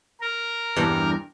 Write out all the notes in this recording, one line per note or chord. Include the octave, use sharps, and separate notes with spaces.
A#4
E2 G2